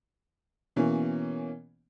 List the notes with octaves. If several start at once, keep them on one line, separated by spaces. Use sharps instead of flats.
B2 E3 A#3 C#4